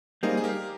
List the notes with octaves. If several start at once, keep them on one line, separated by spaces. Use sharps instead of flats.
G3 A#3 D#4 G#4 C5
G#4
G4 A#4